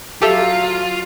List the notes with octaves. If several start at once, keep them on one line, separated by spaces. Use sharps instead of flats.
F#3 F4 G4 A4 E5